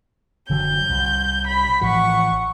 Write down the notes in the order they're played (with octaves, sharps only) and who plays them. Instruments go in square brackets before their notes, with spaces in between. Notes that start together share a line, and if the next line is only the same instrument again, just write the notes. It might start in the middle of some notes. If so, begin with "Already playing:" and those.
[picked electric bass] F#1 D3 F#3 [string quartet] G6
[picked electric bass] C2
[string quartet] B5
[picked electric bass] A1 F3 [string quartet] F#5 C#6